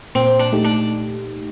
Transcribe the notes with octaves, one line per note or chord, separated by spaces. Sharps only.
A#2 C4
D4
A3 D#4 G4
D4